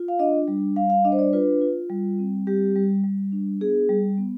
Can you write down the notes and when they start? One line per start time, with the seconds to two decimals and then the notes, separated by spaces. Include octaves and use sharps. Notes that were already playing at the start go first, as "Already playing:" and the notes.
Already playing: F4
0.08 F5
0.19 D4 D#5
0.48 G3
0.76 G3 F5
0.90 F5
1.05 D4 D#5
1.12 C5
1.19 D5
1.33 F4 B4
1.61 F4
1.90 G3
2.19 C4
2.47 G3 G4
2.75 G3
3.04 G3
3.32 D4
3.61 B3 G#4
3.89 G3
4.18 B3